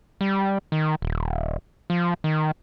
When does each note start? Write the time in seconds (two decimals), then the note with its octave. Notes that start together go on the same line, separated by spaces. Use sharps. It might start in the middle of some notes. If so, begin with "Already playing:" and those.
0.21 G3
0.72 D#3
1.02 D#1
1.90 F3
2.24 D#3